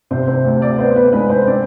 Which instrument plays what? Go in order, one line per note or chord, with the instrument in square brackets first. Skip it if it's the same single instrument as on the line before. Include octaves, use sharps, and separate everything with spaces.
[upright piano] C3 C5
C5
D2
D5
B3 C5
B4
G#3 B4
C5
C4 D5